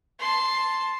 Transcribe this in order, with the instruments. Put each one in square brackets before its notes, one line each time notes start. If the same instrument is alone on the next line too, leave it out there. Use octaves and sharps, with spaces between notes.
[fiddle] A5 C6